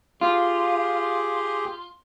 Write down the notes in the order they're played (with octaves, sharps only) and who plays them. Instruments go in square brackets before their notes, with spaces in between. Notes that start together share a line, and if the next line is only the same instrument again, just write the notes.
[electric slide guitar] F4 [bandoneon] G4 G#4